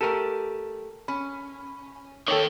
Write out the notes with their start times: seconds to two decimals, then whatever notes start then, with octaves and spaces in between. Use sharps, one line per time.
0.01 A3 G4 A4 A#4 D#7 E7
1.08 C#4 B5
2.28 D#3 G4 A4 C#5 D6